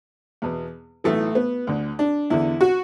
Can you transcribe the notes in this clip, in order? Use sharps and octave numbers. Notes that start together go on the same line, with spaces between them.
E2 B2
B1 A2 E3 A3
B3
D2 D3
D4
E2 D3 E4
F#4